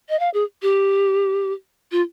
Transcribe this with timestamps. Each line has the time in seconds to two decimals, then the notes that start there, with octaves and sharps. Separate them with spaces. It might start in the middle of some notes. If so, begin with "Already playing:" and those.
0.09 D#5
0.20 F5
0.34 G#4
0.62 G4
1.92 F4